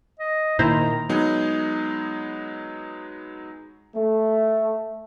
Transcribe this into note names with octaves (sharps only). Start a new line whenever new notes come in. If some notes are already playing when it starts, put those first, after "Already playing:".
D#5
A#2 D#3 E4 C5 A#5
F#3 G#3 B3 D#4 G#4
A3